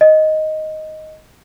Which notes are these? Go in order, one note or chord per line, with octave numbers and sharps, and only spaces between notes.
D#5